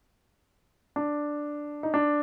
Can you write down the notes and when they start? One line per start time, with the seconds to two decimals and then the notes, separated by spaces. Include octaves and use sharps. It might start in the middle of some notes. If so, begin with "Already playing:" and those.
0.96 D4
1.83 D#4
1.94 D4